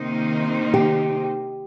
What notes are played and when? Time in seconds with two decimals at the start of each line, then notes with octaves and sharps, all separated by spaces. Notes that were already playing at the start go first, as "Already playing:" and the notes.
Already playing: C3 D#3 A#3 D#4 C5
0.74 G4